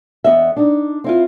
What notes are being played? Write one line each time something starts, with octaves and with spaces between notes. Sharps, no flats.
E2 B3 D#5 E5
D4 D#4
C4 E4 F4